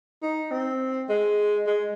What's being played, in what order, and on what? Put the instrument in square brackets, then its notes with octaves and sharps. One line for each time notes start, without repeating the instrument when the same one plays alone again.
[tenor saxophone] D#4
C4
G#3
G#3